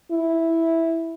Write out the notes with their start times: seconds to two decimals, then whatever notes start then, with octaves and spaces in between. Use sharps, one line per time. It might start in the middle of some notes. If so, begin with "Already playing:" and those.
0.11 E4